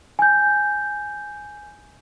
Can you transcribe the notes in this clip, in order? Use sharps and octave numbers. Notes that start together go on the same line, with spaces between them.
G#5 G6